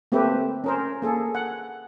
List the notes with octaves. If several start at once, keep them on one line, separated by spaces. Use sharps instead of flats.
A3 A#3 C4 G4 B4 E5
C#4 A#4 C5
A#3 G#4 A4
F#5